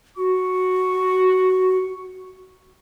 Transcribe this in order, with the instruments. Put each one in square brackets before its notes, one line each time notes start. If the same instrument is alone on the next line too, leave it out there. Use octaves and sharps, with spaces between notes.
[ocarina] F#4 [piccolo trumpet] C#6